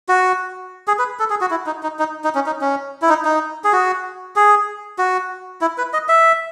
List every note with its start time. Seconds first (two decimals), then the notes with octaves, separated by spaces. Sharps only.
0.09 F#4
0.88 G#4
0.99 B4
1.19 A4
1.30 G#4
1.41 F#4
1.51 E4
1.66 D#4
1.83 D#4
1.99 D#4
2.24 D#4
2.35 C#4
2.46 D#4
2.61 C#4
3.02 E4
3.09 D#4
3.25 D#4
3.64 G#4
3.73 F#4
4.36 G#4
4.98 F#4
5.61 E4
5.78 B4
5.93 D#5
6.09 E5